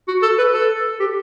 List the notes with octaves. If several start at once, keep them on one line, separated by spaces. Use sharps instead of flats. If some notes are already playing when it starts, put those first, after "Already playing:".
F#4
A4
B4
A4
G4